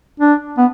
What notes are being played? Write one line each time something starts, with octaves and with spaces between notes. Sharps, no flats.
D4
B3